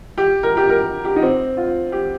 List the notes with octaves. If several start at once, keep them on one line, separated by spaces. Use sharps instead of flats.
G4
A#4
G4
A#4
G4
D#4
C4
F4
G4